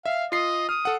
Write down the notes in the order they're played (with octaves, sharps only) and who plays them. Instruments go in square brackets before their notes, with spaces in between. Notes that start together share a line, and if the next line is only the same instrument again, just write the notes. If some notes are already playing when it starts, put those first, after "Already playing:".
[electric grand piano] E5 [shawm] F5
[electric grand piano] F4 C7 [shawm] D#5
[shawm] D#6 [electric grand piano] F6
[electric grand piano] A4 F#5